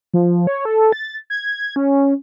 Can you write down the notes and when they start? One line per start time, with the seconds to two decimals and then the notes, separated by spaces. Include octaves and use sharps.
0.14 F3
0.47 C#5
0.65 A4
0.92 A6
1.30 G#6
1.76 C#4